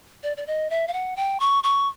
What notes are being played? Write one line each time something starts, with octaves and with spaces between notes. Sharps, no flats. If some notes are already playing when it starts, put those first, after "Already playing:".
D5
D5
D#5
E5
F5
F#5
G5
C#6
C#6